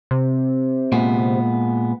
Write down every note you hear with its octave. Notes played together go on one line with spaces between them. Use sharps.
C3
A#2 G#3 B3